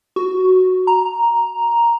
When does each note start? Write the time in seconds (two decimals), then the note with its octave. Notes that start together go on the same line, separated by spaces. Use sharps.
0.16 F#4
0.87 A#5